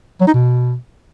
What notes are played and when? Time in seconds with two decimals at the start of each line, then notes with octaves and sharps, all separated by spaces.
0.20 F#3
0.27 D#4
0.34 B2